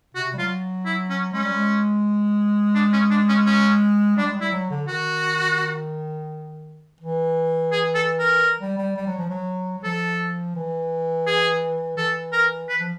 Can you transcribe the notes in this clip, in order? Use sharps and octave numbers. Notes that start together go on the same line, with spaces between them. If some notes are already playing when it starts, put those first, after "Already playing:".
C3 F#4
G3
F#3 F4
E4
C#4
G#3 C#4
G3
G#3
D4
C#4
D4
C#4
C#4
G3 D4
G#3
G3
E4
F#3
D3
D#3 F#4
E3
G#4
A4
A#4
G3
G3
G3
F#3
F3
F#3
F#3
F3 A4
E3
G#4
E3 A4
A#4
B4
F3